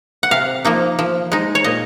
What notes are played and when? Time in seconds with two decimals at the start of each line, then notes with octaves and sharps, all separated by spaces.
0.23 F#5
0.31 C3 F5
0.65 F3 A#3 D#4
0.99 F3
1.32 G#3 D#4
1.55 C#5
1.64 A#2 D#5